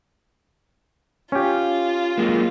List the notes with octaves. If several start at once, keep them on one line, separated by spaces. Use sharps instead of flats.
C#4 F4 G4
F#3 G#3 A#3